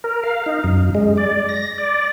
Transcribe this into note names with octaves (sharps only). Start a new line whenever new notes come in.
A#4
F5
D#4
F#2
G#3
D5
A#6
D5